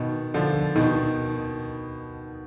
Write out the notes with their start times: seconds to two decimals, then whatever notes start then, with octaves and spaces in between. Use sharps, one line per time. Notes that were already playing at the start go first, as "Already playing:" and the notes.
Already playing: B2 D#3
0.34 D3 F3
0.76 B2 D#3